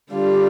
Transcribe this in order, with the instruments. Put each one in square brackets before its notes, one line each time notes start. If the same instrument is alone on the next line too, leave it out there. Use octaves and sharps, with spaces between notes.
[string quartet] D3 G3 D4 F4